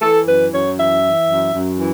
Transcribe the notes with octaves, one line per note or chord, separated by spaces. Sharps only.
E3 A4
F#2 B4
F#2 C#5
E3 E5
E3
F#2
F#2
E3